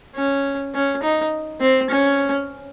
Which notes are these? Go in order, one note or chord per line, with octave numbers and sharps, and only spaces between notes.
C#4
C#4
D#4
C4
C#4